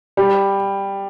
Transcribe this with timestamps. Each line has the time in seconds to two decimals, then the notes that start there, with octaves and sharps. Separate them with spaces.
0.17 G3